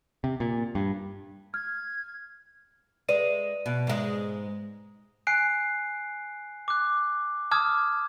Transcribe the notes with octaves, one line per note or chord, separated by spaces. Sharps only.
C3
A#2
G2
F6 G#6
G#3 B4 D5 D#7
B2
G#2 G#3
G#5 F#6 C7 D7
D6 F#6
A5 D6 D#6 F6 G#6